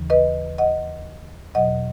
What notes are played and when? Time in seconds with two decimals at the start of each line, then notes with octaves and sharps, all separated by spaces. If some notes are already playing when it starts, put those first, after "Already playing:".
Already playing: D#2 C#3 E3
0.10 B4 D#5
0.58 D#5 F#5
1.55 E2 B2 F#3 D#5 F#5